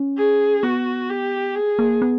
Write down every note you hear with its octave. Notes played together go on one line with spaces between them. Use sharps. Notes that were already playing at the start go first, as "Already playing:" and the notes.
Already playing: C#4
G#4
B3 F#4
G4
G#4
A#3
B3